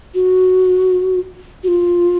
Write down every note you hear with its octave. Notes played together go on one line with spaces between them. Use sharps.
F#4
F#4
F4